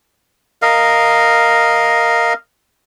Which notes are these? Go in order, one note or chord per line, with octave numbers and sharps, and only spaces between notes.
A#4 D#5 F5